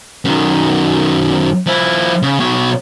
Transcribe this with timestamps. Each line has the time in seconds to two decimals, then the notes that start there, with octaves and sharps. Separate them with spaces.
0.25 F#2 D#3
1.67 F3 E4
2.23 C#3
2.40 B2 C#5